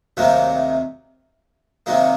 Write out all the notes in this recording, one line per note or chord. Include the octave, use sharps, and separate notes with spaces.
D2 C3 D#3 F#3 A#3
C3 D#3 F#3 A#3